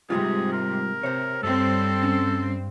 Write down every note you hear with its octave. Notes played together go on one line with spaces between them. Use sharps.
G#2 C3 G3 B3 F4 G#4
A#4
C3 C5 C#5
G2 G3 C4 A4
C#4